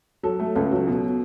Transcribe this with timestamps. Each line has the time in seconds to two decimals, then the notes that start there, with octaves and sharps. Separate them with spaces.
0.23 F#3 A4
0.39 A3
0.55 C#2 A4
0.71 F#3
0.87 B2